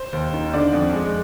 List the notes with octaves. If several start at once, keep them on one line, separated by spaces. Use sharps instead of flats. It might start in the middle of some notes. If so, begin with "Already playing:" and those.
Already playing: C5
D#2
D#3
D3 D5
F2
G#3